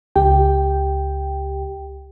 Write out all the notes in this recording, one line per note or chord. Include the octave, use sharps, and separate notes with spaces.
C#2 G4 G5